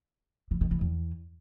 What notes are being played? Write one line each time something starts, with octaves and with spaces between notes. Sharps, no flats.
E3
D#3
E3
E2